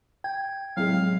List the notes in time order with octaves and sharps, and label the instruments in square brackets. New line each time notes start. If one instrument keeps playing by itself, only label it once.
[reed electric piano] G5 [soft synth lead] G#6
[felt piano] A2 C3 G#3 [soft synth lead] F#3 [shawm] F5